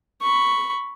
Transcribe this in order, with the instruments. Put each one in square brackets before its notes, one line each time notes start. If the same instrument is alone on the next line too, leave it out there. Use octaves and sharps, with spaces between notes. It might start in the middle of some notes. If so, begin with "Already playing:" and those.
[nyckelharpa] B5 C#6